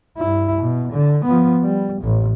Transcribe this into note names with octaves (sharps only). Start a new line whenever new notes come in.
G2 E4
B2
D3
F3 B3
G3
A1 A2